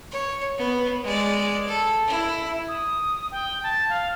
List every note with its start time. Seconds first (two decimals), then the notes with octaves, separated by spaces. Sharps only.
0.11 C#5
0.58 B3
1.04 G#3 D5
1.67 A4
2.07 E4
2.68 D#6
3.31 G5
3.63 A5
3.89 F5